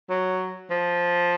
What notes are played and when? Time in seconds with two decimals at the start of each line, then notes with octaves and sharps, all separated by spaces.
0.09 F#3
0.70 F3